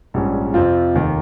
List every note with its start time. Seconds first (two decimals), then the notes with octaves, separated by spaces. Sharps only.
0.14 A#1 G#2 G3 C#4
0.54 F2 C3 F3 C4 F4
0.95 F1 D#2 D#3